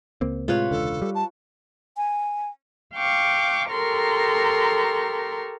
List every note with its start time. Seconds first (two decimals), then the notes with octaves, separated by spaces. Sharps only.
0.21 C#2 A#3 C4
0.48 A2 C3 G#3 F4 B4 C#5
0.71 E1 C#2 D3 A4
1.02 G3
1.15 A5
1.97 G#5
2.95 F5 G5 C#6 D6
3.71 G4 A4 A#4 A#5 C6 C#6